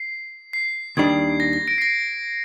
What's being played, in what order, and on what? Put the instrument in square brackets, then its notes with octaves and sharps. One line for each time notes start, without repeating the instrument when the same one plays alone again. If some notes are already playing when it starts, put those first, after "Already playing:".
Already playing: [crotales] C7
C7
[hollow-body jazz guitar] D#2 D#3 G3 D4 [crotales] G#6
[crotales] A#6
A#6
A#6 D7
C7
A#6 D7